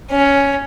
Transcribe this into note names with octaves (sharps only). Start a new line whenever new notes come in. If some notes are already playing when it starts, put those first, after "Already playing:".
C#4